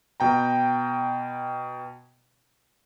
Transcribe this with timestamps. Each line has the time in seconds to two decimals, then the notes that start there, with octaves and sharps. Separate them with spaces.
0.20 B2 G5 A#5